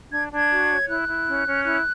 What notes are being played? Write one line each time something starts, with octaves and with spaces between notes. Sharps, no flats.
D4 G#6
D4 G#6
F#4
C#5
E4 F#6
E4
C#4
C#4
E4 F#6